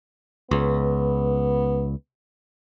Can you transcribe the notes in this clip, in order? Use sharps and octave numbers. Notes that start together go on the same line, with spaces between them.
C#2 B3